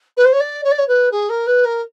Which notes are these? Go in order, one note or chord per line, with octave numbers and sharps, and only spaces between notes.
B4
C5
C#5
D5
C#5
D5
C#5
B4
G#4
A#4
B4
A#4